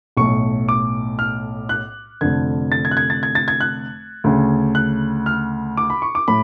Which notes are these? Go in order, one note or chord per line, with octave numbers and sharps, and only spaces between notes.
B1 A2 C#6
D6
F6
F#6
F1 F2 D3 G#6
A6
G#6
F#6
G#6
A6
G#6
A6
G#6
F#6
D2 C#3
F#6
F6
D6
B5
C#6
D6
A2 B5